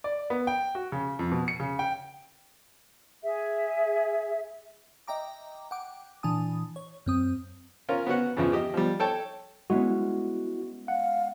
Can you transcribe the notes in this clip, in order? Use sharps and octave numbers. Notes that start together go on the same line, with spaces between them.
D5
B3
G5
F#4
C#3
F2
B2
C#7
C#3
G5
G#4 E5
D#5 E5 G5 A#5 D6
F#5 G5 D6
A#2 E3 D4 G#5 A5 D#6
C#5
F#2 C4 D#6
C#4 F4 A#4
B3 C#4 F#4 F#5
F2 C#3 E3 F3
G4 D#5
F3 G3
A4 C#5 G5 A5
G#3 B3 C#4 E4 F#4
F5 F#5